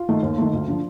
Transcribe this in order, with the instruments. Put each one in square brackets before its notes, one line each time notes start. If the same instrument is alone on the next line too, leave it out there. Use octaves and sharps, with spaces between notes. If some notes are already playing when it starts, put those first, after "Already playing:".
Already playing: [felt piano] F4
D#3 A3
D#2
D#3 A3
D2
D3 F3